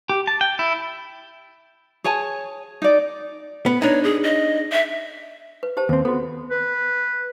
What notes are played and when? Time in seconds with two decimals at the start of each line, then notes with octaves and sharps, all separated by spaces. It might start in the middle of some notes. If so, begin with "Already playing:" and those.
0.10 G4
0.27 A5
0.41 G5
0.59 E4
2.04 G#4 C#5 G#5 A5
2.82 D#4 D5
3.66 B3
3.82 D4 D#4 C#5
4.04 G#4
4.23 D#5
4.72 E5
5.63 B4
5.77 G4 C5 A5
5.89 D#2 C4
6.05 B3 F#4 A4
6.50 B4